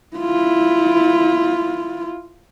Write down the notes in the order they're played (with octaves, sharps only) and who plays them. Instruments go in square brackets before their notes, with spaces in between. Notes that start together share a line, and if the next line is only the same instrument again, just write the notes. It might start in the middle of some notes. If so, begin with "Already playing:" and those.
[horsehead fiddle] E4 F4